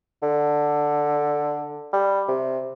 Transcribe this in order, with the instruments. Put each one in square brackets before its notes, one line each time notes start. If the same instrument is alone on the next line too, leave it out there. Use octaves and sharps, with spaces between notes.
[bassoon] D3
G3
C3